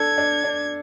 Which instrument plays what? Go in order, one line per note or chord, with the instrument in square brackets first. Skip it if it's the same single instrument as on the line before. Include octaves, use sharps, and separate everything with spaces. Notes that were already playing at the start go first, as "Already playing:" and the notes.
Already playing: [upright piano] D4 A4 [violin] G#6
[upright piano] D4
D4